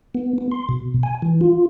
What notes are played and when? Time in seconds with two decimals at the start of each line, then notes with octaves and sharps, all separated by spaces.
0.15 B3
0.38 B3
0.51 C6
0.69 B2
1.03 G#5
1.22 E3
1.41 F4